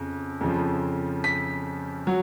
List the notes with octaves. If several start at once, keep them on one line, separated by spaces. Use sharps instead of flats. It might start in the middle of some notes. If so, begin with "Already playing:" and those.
Already playing: F2 C#3
F2 C#3 F3
B6
F#3